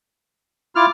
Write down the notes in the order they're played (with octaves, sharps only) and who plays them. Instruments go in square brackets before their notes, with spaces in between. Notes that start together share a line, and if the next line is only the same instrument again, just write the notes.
[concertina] E4 F4 F6 [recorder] D6